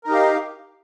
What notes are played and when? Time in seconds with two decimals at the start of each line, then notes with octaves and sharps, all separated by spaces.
0.04 A#4
0.07 D#4
0.11 G4
0.14 F5